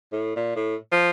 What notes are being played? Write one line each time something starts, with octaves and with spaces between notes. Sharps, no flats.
A2
A#2
A2
F3